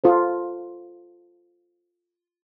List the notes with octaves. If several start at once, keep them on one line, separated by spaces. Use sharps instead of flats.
F4 A4 C5